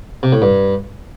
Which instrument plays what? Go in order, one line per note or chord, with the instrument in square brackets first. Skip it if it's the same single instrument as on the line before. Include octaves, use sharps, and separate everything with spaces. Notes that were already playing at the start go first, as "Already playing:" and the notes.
[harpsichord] C3
A2
G2